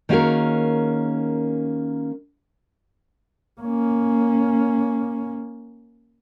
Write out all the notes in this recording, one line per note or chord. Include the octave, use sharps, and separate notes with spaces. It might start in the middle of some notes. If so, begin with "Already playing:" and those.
D#3 A#3 C#4 F#4 G#4 A#4
A#3 C#4